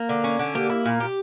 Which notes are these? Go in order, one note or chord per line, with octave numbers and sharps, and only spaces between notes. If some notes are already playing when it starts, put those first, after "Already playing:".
Already playing: A#3
D3
C#4
D3
A#3 G4
E4
A#2
G4